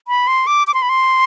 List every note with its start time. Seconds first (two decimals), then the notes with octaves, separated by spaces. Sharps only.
0.08 B5
0.27 C6
0.47 D6
0.67 D6
0.74 C6
0.82 B5
0.89 C6